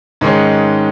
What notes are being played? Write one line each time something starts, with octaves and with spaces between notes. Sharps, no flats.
G#2 D#3 G#3 C#4